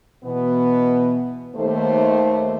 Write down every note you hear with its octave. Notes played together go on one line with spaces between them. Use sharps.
B2 E3 B3
D#2 A3 C5